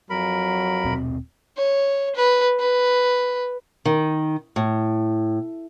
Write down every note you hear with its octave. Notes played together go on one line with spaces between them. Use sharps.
F2 F#3 A#4 B5
D#1 B2 C4
C#5
B4
B4
D#3
A2